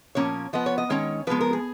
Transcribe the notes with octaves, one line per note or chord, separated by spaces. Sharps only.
A#2 F3 A#3 C#4 C#5
F3 B3 D#5
C#5
D#5
D#3 G#3 C#4 C#5
F3 G#3 B3 B4
A#4
G#4